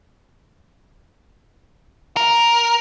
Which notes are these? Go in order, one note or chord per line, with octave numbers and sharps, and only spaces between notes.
A#4